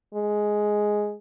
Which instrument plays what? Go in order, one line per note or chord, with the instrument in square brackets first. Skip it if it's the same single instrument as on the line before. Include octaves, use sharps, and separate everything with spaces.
[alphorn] G#3